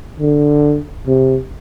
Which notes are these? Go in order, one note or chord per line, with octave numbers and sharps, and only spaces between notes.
D3
C3